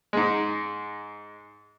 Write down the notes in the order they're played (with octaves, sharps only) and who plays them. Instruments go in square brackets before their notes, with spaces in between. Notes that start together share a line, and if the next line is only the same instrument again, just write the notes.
[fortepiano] G#2 G#3